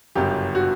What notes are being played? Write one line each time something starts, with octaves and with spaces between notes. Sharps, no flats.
G1 F#2 C#3 G4
F#4